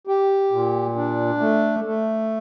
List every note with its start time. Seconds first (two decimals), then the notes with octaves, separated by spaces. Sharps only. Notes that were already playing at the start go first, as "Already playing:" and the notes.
0.07 G4
0.52 A#2
0.96 D4
1.40 A3
1.84 A3